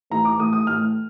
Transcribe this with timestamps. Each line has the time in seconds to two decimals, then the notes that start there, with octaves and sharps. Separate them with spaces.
0.10 A2 E3 A3 A#5
0.25 D6
0.39 A2 E3 A3 D#6
0.53 D#6
0.67 A2 E3 A3 F6